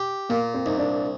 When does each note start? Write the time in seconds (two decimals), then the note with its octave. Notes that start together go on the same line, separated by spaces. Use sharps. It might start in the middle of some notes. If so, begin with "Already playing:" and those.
Already playing: G4
0.29 A#2 A#3
0.54 C4
0.66 C2 D#4
0.78 D4